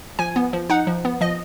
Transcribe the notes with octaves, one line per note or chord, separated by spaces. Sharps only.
F3 G#5
B3
F3
D#4 F#5
F3
B3
F3 D#5